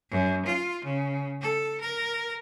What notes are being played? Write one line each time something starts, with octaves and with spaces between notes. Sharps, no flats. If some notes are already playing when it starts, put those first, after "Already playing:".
F#2
F4
C#3
A4
A#4